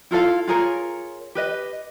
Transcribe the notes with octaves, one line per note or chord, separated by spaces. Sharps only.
E4 F4 A4 F5
F4 G#4 A#4 C#5
G4 B4 D#5